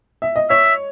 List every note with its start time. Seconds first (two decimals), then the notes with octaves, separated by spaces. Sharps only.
0.22 E5
0.36 D#5
0.50 C#5 E5